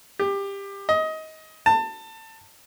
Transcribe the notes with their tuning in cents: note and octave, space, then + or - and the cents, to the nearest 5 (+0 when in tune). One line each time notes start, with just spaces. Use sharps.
G4 +20
D#5 +20
A5 +25